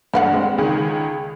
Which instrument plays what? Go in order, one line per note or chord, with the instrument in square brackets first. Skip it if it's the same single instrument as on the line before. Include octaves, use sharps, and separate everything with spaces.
[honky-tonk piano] G2 [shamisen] D3 F5 F#5
[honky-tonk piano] G#3 C4
C#2 D#3 G#4